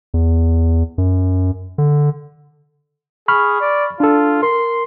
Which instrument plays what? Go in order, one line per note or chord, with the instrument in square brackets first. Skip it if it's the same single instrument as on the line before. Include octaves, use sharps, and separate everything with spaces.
[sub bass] E2
F#2
D3
[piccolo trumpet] G#4 [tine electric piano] B5 C#6 F6
[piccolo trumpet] D5
[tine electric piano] D4 A4 [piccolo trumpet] F4
[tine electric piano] A#4 [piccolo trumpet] C6